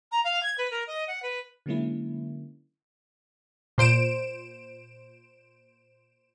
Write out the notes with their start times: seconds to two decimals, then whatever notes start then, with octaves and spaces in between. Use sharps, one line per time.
0.12 A#5
0.24 F5
0.43 G#6
0.58 B4
0.71 A#4
0.87 D#5
1.08 F#5
1.23 B4
1.66 D3 F#3 G#3 A#3 C#4 E4
3.78 A#2 C5 D7 E7